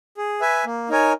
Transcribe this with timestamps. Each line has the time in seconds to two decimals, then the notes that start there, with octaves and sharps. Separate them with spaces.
0.17 G#4
0.41 B4 E5 G#5
0.65 A#3
0.89 D#4 A#4 C#5 G#5